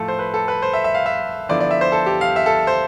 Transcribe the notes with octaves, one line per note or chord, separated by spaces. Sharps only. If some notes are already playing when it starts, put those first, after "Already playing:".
Already playing: A2 F3 A3 A4
C5
B4
A4
B4
C5
E5
E5
F5
E5
D3 F3 B3 E4 D5
D5
E5
C5
A4
G4
F5
E5
A4
C5